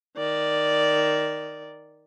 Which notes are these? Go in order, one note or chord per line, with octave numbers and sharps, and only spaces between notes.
D#3 D5